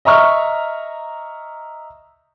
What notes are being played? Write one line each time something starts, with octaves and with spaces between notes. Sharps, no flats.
D#5 E5 A#5 C#6 F6